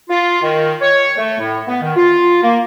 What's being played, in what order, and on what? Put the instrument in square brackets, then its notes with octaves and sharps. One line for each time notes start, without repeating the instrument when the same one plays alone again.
[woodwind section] F4
D#3
C#5
A3
A2
B3
D#3
F4
A#3